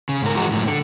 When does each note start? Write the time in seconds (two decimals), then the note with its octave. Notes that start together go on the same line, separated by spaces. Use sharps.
0.09 C#3
0.22 G#2 A#4
0.34 E3 F3 G#3 F#4
0.52 F#2 A2
0.67 D3